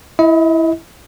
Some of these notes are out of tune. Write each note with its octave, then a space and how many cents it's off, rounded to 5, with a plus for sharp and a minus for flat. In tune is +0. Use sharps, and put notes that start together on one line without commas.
E4 +0 D#5 +40